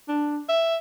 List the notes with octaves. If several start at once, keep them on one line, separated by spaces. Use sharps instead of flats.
D4
E5